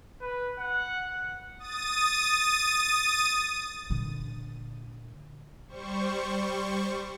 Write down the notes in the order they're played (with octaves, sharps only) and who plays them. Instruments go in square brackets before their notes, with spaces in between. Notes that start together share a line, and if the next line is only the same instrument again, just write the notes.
[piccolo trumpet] B4
F#5
[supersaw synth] D#6 A6 D#7
[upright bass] A#2 D3
[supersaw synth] G3 C5 C#6